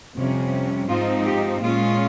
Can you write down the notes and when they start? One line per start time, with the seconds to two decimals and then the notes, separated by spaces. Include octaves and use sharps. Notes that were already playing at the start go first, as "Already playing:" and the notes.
0.16 F2 C3 G3 C#4
0.88 G#2 F3 C4 D#4 F4
1.25 G4
1.61 A#2 G#3 C#4 F4